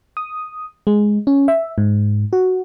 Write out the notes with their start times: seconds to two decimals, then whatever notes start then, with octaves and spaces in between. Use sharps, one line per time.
0.17 D#6
0.87 G#3
1.27 C#4
1.48 E5
1.78 G#2
2.33 F#4